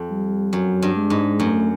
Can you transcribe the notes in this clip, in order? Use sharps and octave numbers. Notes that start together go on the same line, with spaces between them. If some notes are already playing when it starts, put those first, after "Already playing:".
Already playing: F2
G3
F#2 F#3
G2
G#3
G#2
F#2 A3